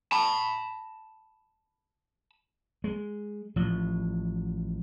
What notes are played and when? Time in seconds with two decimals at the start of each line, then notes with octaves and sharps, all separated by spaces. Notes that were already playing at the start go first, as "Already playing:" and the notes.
0.12 A5 B5
2.84 G#3
3.56 A1 F3